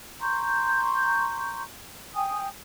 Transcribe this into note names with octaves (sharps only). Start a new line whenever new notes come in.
A#5 C6 C#6 G6
G5 G#5 D#6